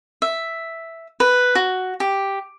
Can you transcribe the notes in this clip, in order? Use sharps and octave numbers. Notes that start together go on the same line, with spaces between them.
E5
B4
F#4
G4